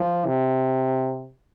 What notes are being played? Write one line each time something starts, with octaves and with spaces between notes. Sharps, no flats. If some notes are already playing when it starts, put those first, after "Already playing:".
Already playing: F3
C3